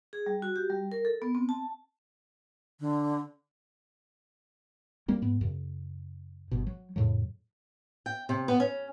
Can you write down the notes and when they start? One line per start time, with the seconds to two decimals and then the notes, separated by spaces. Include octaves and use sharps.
0.13 G#4
0.26 G3
0.42 F#4
0.56 G4
0.70 G3
0.92 A#4
1.05 A4
1.22 B3
1.35 C4
1.49 A5
2.80 D3
5.08 G3 A#3 C4
5.22 G#2 B3
5.41 F#2 C#3
6.51 G1 B2
6.67 F#3
6.96 F2 A2 C#3 F#3
8.06 G5
8.29 C3
8.48 B3
8.60 C#4